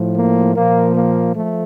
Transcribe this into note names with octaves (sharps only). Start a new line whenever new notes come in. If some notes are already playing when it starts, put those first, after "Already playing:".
Already playing: A2 F3
A#3
A#2 F3 A#3
A#3
F3 A3